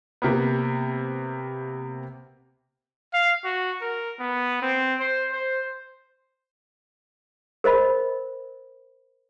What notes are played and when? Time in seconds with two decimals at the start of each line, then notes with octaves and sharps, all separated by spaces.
0.22 C3 A#3 B3
3.13 F5
3.45 F#4
3.81 A#4
4.19 B3
4.62 C4
5.00 C5
5.32 C5
7.64 A#4 C5 D#5 B5